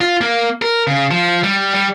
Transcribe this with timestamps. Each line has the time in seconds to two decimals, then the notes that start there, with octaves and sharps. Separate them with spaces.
0.01 F4
0.21 A#3
0.62 A#4
0.87 C#3
1.11 F3
1.44 G3
1.74 G3